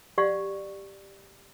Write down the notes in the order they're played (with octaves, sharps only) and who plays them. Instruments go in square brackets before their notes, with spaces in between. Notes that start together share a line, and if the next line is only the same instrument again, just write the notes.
[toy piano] G4 D5 F5 F#5 C#6